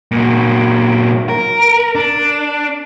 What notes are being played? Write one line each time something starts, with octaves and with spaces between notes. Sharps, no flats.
A#2 F#3
A#4
D4